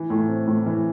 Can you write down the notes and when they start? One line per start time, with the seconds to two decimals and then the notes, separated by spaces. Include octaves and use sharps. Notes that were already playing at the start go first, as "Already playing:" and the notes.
Already playing: E3
0.10 A2
0.29 C4
0.48 A2
0.66 E3